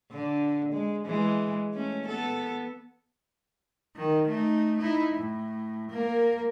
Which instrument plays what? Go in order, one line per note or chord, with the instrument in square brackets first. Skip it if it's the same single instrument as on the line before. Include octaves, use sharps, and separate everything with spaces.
[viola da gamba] D3
G#3
E3 G#3
A3 C#4
B3 A4
[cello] D#3
A3 D#4
D#4 E4
A2
A#3 A#4